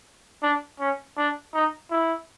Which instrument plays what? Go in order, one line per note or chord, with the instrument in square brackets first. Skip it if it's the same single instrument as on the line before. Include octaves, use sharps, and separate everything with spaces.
[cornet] D4
C#4
D4
D#4
E4